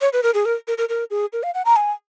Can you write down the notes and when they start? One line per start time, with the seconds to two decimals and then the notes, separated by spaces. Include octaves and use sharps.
0.01 C#5
0.13 B4
0.23 A#4
0.34 G#4
0.45 A#4
0.67 A#4
0.78 A#4
0.89 A#4
1.10 G#4
1.33 A#4
1.43 F5
1.54 F#5
1.65 A#5
1.76 G#5